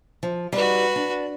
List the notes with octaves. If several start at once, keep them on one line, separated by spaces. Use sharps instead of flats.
F3
G3 D#4 F#4 B4
D4